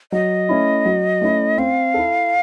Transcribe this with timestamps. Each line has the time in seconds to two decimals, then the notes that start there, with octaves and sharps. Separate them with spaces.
0.12 F#3 D#5
0.49 A3 C#4 E4
0.85 F#3
1.21 A3 C#4 E4
1.58 C4 F5
1.94 E4 A4